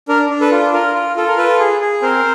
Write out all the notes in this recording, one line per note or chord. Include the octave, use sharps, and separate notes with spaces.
D4 A#4
D4
A4 B4
F4
F4 A#4
F4
F4 A4
A#4
F4 A4 B4
G#4
G#4
C4 A#4 C5